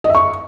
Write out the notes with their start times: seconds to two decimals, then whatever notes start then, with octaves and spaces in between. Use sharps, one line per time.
0.04 D#5
0.09 E5
0.15 C#6